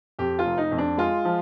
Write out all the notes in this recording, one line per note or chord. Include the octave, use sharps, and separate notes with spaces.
F2 G4
F4
F1
D#4
F2
D4
G#3 F4
F3